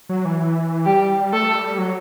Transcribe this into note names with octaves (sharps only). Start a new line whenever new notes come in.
F#3
E3
G3 G4
A3 A4
G3
F#3